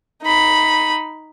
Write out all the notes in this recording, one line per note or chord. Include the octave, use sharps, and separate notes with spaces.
D#4 B5